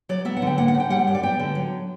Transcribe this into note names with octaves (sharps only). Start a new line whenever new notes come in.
F#3 D5
B3 E5
F#5
D3 G5
A#3 F#5
F#5
C#3
G5
G3 F#5
G5
F#2 F#5
D5
B3 G5
D3
F#3